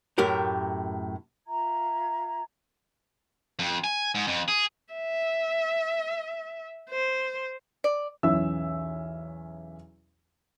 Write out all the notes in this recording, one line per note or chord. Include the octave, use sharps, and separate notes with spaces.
F#2 A2 G4 A#4
F4 E5 A#5 G#6
F2
G#5
G#2
F2
G#4
E5
C5
D5
B1 E2 C#4 E4 E5 E6